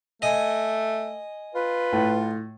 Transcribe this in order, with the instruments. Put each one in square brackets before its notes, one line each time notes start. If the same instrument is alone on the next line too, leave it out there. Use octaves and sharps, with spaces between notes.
[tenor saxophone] A3 [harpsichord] D#5 G#5
[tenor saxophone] F4 [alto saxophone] B4
[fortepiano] A2